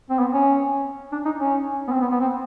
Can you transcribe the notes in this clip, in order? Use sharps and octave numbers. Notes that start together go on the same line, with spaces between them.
C4
B3
C#4
D4
D#4
C#4
B3
C4
B3
B3
C4